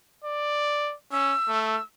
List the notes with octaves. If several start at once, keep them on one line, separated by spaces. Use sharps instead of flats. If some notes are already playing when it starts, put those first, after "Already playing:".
D5
C#4 E6
A3